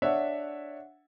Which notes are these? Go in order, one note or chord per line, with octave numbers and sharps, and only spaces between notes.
D4 C#5 E5 F#5